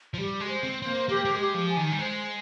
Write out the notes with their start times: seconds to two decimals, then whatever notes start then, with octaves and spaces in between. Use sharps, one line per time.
0.14 F3
0.18 G3 G4
0.40 G#3
0.48 C5
0.63 C4
0.79 C4 C5
0.86 A#3
1.09 A#3 G4
1.25 A#3
1.31 G#3
1.39 G4
1.55 F3
1.69 G#5
1.77 D#3
1.92 G3
1.99 G#3 C5